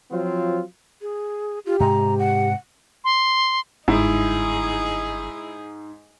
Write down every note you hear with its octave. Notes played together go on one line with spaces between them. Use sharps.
F3 F#3 C4 F4
G#4
F4 G4
G#2 C3 G#3 A#5
F#5
C6
G1 G#2 D#4 E4 G#4